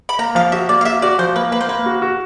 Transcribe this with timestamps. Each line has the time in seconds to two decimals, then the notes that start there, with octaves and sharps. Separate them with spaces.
0.09 B5
0.19 A#3 A#5
0.35 F3 F5
0.52 F#4 E5
0.69 A#3 D5
0.81 F5
0.85 F#4 E5
1.02 F#4 D5
1.19 F3 C5
1.36 A#3 B4
1.52 A#3 B4
1.61 C5
1.69 A#3 B4
1.86 F#4
2.02 F#4